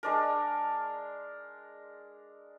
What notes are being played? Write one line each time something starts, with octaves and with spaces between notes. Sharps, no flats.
G#3 D4 A#4